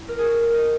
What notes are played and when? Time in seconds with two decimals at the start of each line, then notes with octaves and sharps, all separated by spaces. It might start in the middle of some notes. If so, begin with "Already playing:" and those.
Already playing: E4
0.08 A#4
0.19 G#4
0.24 F#4
0.30 G#4
0.40 A#4
0.55 D#5